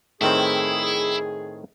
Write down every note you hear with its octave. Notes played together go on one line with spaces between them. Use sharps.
A2 D#3 C4 E4 G#4